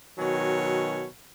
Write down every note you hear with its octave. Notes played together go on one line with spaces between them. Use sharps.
B2 D#3 F#3 C#5 G#5